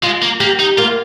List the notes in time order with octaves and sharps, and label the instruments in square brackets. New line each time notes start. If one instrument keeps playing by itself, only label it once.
[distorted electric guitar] G#3 [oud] F4
[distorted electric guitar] A#3
[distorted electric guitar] A#3 [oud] G4
[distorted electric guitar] D#4
[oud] A#3 [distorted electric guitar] F4